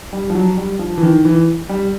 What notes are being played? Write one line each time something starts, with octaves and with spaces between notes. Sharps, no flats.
G3
F3
F#3
G3
F3
E3
D#3
E3
G3